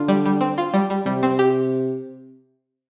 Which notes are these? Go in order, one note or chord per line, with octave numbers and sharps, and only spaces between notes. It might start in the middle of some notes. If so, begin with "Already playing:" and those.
Already playing: D3 F4
G3
G3
C4
F4
G3
G3
C3 G3
C4
G4